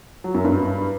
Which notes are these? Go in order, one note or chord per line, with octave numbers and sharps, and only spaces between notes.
F#3
F#2
G2